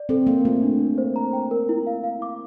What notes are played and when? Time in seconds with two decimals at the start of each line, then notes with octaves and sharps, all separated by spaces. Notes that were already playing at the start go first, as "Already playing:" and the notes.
Already playing: D5
0.09 C4 A4
0.27 A#3 F5
0.45 A3 F4
0.63 D4
0.81 A#4
0.98 C5
1.16 A#5
1.33 G5
1.51 A#4
1.69 E4
1.87 F5
2.04 F5
2.22 D6